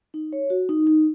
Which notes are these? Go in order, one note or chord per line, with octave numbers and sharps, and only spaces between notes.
D#4
C#5
F#4
D#4
D#4